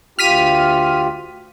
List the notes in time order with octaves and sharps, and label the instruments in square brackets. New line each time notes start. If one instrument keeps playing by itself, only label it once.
[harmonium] D2 F4 G4 [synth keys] F6 B6 D#7